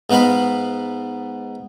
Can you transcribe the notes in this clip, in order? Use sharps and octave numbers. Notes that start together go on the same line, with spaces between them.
G#2 B3 D#4 F5 B5